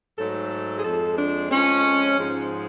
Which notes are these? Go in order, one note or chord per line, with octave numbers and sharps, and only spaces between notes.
G#2 F#3 A3 A4
G#4
F2 F3 G#3 A4
D4
F2 F3 G#3 C#4
G#2 F3 G#3